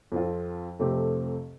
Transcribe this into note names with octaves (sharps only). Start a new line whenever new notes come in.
F2 F3 C4 F4
F2 C3 A3 C4 G4